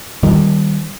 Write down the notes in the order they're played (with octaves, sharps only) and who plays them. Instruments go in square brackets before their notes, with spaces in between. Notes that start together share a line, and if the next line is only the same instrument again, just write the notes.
[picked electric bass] D#3 G3